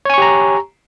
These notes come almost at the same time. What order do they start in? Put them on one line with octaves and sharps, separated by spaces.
C#5 G#5 C#6 G4 A#5